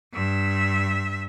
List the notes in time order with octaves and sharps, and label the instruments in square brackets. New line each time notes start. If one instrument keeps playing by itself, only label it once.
[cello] G2 E5